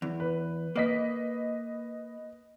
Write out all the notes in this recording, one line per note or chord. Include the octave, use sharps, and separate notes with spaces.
E2
B4
A#3 B4 D#5 B6